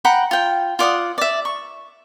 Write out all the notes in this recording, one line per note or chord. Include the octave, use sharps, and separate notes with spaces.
F#5 G5 A#5 B5
F4 G5
F4 D5 F#5 D#6
D5 E5
C#6